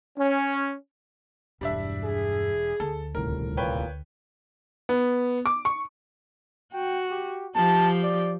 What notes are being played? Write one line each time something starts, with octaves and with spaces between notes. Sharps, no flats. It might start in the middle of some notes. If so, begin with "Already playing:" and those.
C#4
E1 G2 G3 D4 E5
G#4
D2 A4
D#1 C2 A2 A#4
A#2 B4 C#5 G5
B3
D6
C#6
F#4 G5
G4
F3 G4 A5
D5